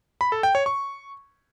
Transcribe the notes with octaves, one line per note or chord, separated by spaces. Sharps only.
B5
A4
G5
C#5
C#6